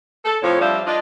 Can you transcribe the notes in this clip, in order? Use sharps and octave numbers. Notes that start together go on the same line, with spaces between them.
A4
F2 A2 F3 C#5
F3 G3 D4 C5 E5 F5
D4 F4 D#5